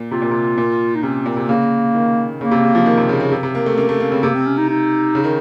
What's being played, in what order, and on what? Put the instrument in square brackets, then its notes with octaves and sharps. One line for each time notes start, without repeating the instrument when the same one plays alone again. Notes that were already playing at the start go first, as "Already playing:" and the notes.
Already playing: [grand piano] A#2
[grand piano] C3 [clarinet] F4
[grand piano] A#2
C3
A#2
[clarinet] D#4
[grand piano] C3 [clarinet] C#4
[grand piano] A#2 [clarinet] C4
[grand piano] C3
[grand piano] C#3 [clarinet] A#3
[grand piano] D#3
[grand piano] C#3 [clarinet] A#3
[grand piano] C3
C#3
F3
D#3
C3
C#3
C#3
C3
C3
A#3
A3
[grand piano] A#3 [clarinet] C#4
[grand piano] A3 [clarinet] C#4
[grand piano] A#3 [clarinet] C#4
[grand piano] C#3 [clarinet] C4
[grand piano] C3 [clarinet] A#3
[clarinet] C4
C#4
D#4
D#4
[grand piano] C#3
D#3